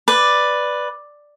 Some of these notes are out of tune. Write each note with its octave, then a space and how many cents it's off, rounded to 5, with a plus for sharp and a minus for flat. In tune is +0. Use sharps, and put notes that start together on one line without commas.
B4 +0 D5 +5